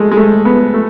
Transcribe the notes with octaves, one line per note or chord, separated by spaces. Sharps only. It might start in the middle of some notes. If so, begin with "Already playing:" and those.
Already playing: G#3 A3
G#3
A3
B3
A3